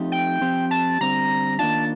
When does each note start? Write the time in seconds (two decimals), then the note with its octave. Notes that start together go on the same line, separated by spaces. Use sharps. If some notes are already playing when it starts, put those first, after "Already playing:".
Already playing: F3 A3 C4 D#4 G4
0.12 G5
0.41 F3 C4 G4
0.71 A5
1.01 D3 G3 C4 A#5
1.59 D#3 A#3 D4 F4 A5